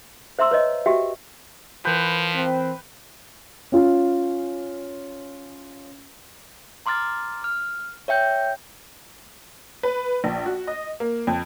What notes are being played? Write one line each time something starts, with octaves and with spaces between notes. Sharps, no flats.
C5 E5 A#5 C6 E6
B4 C#5 D#5
F#4 G4 E5 G5
E3 F3 A#4 B4 G5
C4
C#4 F4
A#5 C6 D6 F6 A6
F6
C#5 E5 G5 G6
B4
A#1
F#4
D#5
A#3
F2